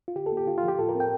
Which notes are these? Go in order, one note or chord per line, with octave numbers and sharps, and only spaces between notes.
F4
D3 G4
A4
A#3
G4
D3 F4
F3 F4
G4
A2 A4
A#4
C4
G5